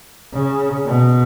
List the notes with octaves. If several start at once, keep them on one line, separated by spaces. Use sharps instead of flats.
C#3
B2